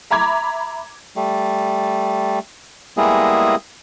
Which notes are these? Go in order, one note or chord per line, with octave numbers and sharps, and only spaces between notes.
E5 A#5 B5 D6 G#6
G3 A3
G3 G#3 A#3 B3 E4 G#4